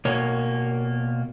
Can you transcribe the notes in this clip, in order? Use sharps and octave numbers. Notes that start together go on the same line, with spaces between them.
B2 A#3 C#5